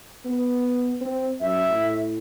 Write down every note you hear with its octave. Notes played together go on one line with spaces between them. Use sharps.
B3
C4
F#2 E5
A2